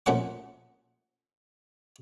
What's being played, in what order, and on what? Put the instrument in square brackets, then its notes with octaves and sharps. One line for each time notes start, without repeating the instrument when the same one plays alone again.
[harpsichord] F2 A#2 A3 C#4 F#5 C#6